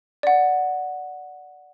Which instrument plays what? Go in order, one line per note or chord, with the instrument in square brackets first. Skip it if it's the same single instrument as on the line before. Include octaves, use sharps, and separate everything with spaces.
[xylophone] D5 F#5